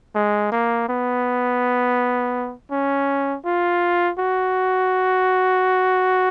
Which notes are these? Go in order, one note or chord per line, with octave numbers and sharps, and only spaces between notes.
G#3
A#3
B3
C#4
F4
F#4